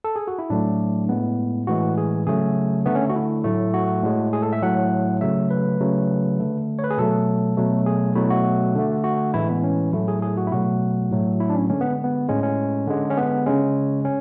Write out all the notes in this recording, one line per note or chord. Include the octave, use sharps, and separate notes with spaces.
A4
G#4
F#4
E4
A2 F#3 A3 D4
A2 G#3 B3
A2 E3 G#3 F#4
G#4
C#3 F#3 A3 G#4
D3 A3 B3
C#4
F#4
E4
A2 F#3 A3
F#4
A2 G#3
G#4
A4
E5
A2 F#3 A3 F#5
C#3 F#3 A3 E5
B4
C#3 F#3 A3
D3 A3
C#5
B4
G#4
B2 F#3 A3 A4
B2 F#3 A3
G#4
B2 F#3 A3 E4
F#4
D3 A3
F#4
A2 E3 G#3 E4
B3
C#4
A2 F#3 A3 E4
G#4
G#4
F#4
E4
B2 F#3 A3 F#4
A2 F#3 A3
E4
D4
C#4
D3 G#3 C#4
B3
B3
A2 G#3 C#4
C#4
D3 G#3
C#4
B3
C#3 G#3 C#4
C#4